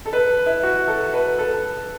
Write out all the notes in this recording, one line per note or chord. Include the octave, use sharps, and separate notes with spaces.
A4
B4
E4
F#4
A4
B4
A4